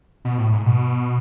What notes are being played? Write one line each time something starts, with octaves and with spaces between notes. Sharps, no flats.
B2
A2
G#2
B2